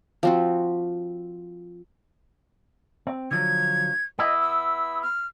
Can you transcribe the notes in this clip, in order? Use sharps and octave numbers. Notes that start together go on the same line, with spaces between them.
F3 C4 F#4
C4
D3 F3 F#3 G#6
B3 E4 D#5
E6
F6